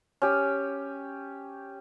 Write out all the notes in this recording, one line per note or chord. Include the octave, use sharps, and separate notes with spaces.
C#4 G4